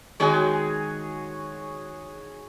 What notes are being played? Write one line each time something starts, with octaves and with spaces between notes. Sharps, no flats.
D#3 G#3 F#4 G#4 C#5 G5